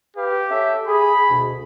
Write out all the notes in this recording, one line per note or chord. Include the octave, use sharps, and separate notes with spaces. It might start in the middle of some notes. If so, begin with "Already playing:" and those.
G4 B4 F5
C#4 A4 E5
G#4 B5
D2 B2